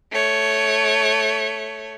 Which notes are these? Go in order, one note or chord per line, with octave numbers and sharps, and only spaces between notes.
A3 C#5